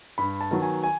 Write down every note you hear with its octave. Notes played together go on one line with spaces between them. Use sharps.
G2 B5
A5
D#3 F#3 B3
G#5
G#5